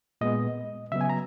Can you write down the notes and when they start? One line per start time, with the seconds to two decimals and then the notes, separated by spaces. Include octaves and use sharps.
0.21 A#2 G#3 B3 D#5
0.92 C#3 F#3 B3 E5
1.01 G#5
1.10 A#5